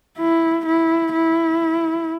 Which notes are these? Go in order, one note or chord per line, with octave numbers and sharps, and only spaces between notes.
E4
E4
E4